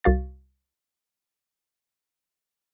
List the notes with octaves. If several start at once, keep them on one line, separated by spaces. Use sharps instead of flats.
C2 F#4 F5 A6